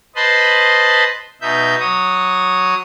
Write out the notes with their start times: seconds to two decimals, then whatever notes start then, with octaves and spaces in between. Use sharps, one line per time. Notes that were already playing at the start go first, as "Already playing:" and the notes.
0.16 B4 C5 D#5 A5 B5 C6
1.41 B2 D#4 E5 G6
1.80 F#3 C#5 D#6